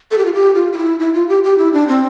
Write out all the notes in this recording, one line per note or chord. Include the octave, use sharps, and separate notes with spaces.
A4
G4
F4
G4
F4
F4
E4
E4
F4
G4
G4
E4
D4
C4